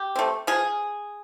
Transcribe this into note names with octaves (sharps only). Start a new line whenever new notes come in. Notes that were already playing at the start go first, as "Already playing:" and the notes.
Already playing: G4
A3 C4
F3 G#4